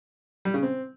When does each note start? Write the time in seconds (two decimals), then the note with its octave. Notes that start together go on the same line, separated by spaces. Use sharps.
0.45 G3
0.54 C#3
0.63 C4